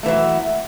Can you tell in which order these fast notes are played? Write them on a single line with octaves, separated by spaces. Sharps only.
A3 E3 F#3